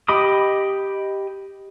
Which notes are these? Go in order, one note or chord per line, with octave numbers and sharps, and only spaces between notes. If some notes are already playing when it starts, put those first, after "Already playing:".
G4 D#5 B5 D6 D#6